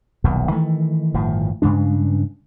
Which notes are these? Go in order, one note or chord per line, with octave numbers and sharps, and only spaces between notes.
D#1 B1 E2
D#3 E3 A3
G1 A2 D#3 F3
G2 C#3 G#3 D4